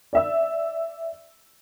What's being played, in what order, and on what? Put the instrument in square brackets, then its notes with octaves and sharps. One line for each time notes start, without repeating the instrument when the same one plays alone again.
[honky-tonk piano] D5 E5 E6